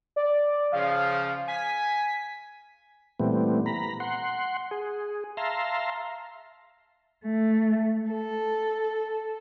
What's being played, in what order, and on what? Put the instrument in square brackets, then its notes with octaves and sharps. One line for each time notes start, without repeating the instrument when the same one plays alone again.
[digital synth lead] D5
[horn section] C#3 F3 [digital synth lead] F5
[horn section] G#5 [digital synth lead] B6
[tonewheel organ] A#2 E3 G3 A3 B3 C4
A#5 B5
F#5 C6
G#4
E5 F5 A5 A#5 C6
[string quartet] A3
A4